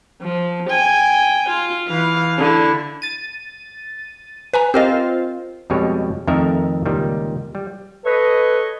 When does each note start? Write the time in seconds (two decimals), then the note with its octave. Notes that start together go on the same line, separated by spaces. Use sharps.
0.21 F3
0.70 G5 G#5
1.50 F4
1.88 E3 F5
2.38 D3 E4
3.02 A6 D#7
4.53 B4 G#5 A#5
4.74 C4 F4 G4 A#4 D#5
5.70 F2 B2 G3 G#3 C#5
6.27 F2 D#3 A3 A#4 E5
6.86 C#2 A#2 D#3 G3
7.55 G3
8.05 A4 B4 C#5 D#5